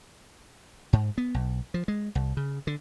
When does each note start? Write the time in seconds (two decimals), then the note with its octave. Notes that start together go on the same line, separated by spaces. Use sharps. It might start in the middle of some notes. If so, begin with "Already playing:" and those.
0.93 G#2
1.18 B3
1.34 B1
1.74 F3
1.88 G#3
2.15 C2
2.37 C#3
2.67 D3